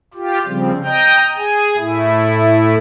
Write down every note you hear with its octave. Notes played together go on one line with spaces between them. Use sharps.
F4 G4
C#3 F3 G3 C4
D#5 G5 A#5 G6
G#4 G#5
A2 A3 E4